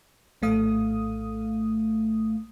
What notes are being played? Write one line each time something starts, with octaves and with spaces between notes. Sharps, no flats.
A#1 A2 A3 F5 D#6